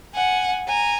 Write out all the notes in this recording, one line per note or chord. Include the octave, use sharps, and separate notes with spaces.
F#5 G#5
G#5 A#5